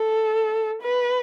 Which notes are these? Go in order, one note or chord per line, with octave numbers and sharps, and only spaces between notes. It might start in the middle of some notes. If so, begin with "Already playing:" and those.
Already playing: A4
B4